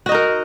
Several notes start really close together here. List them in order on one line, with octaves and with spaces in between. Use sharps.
F#4 D#5 D#4 A#4